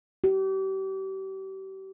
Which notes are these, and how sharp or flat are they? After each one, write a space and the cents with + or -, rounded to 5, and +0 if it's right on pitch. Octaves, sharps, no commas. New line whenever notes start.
G4 -35